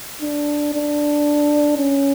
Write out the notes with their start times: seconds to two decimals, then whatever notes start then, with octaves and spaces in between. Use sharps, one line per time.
0.21 D4
0.74 D4
1.78 C#4